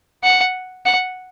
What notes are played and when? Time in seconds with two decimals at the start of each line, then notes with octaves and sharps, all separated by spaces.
0.23 F#5
0.86 F#5